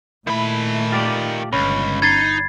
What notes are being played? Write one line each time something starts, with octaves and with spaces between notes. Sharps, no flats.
A#2 D#3 A3 E4 B5
F4 G4 D5
G1 C#2 C#4 B5
D#4 G#6 A6 C7